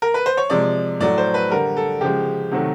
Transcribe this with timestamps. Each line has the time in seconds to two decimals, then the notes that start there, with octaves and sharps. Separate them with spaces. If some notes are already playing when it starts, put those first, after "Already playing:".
0.02 A#4
0.14 B4
0.26 C5
0.37 C#5
0.50 C3 F3 G#3 D5
1.00 A2 F#3 A3 D5
1.18 C5
1.34 B4
1.50 D3 G3 A#4
1.77 A4
2.01 C#3 F3 G#3 G4
2.51 C3 D#3 F#3 A3 F#4